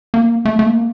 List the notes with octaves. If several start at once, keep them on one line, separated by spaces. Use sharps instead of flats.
A#3
A3
A3
A#3